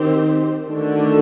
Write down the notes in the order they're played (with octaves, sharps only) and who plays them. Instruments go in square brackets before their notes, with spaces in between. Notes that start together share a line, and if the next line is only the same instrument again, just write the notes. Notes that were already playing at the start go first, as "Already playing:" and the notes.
Already playing: [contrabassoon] D#3 [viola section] C4 G4 C5
[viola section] D3 A3 D4 F#4 [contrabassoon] D#3